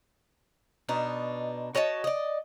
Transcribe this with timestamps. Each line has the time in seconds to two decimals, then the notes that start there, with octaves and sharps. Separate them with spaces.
0.89 B2 D4 D#4
1.75 F#4 C#5 D#5 A5
2.04 D5 D#5